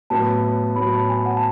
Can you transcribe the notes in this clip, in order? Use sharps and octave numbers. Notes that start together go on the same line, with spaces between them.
A2 F#3 B3 A5
A2 F#3 B3 B5
A5
G#5
F#5
A5